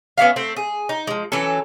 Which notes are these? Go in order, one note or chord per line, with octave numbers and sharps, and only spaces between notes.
B3 C#4 E5 F5
A3 C4 A4
G#4
D#4
F3 G#3
E3 F#3 C#4 A4